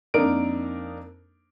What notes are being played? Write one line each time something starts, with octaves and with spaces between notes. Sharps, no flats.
F2 A#3 D4 D#4 A#4 D7